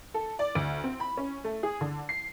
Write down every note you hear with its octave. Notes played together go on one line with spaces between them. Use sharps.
A4
D5
D2
C4
B5
C#4
A3
G#4
D3
C7